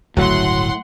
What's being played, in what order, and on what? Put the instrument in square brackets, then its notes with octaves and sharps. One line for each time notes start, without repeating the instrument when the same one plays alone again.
[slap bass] D1 G1 C#3 [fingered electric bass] A2 [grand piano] F#3 [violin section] F#5 C6